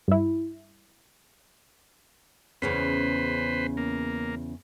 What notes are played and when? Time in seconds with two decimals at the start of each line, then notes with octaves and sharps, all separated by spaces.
0.08 G2 E4
2.62 E2 C#3 C#4 B4 C5
3.77 A#3